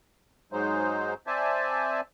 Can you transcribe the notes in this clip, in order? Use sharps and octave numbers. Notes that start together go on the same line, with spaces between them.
G#2 F#3 G#3 D#4 C5
C4 C5 D5 E5 G#5 A5